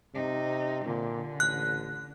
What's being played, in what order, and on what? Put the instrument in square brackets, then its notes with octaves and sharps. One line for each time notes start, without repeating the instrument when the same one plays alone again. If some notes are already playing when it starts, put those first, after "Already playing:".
[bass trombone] C3 [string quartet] D#4
[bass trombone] A#2 [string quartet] D3
[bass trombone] A1 [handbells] F#6